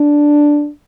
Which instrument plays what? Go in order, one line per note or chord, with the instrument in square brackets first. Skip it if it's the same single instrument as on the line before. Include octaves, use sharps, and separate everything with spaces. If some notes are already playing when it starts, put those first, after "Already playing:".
Already playing: [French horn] D4